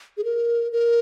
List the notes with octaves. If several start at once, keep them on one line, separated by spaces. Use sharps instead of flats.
G#4
A#4
A#4